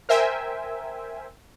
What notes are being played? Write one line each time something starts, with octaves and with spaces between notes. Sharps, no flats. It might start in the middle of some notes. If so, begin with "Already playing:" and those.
A#4 C5 E5 G5 G#5